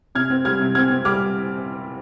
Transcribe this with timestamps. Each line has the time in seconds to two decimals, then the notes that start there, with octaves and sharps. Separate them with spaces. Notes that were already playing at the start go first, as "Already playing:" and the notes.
0.15 C3 F6 G#6
0.30 C4
0.45 G3 F6 G#6
0.60 C3
0.75 C4 F6 G#6
0.91 C4
1.05 G3 D6 F6